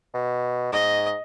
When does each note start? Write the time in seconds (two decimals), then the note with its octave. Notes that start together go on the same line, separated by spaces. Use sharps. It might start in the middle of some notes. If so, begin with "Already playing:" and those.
0.14 B2
0.72 G#2 D#5